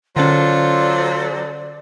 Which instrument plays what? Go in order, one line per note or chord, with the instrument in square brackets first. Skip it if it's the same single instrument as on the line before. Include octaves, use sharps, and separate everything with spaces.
[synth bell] D3 C#4 [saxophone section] F#3 A4 C5 [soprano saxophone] F4 [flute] D5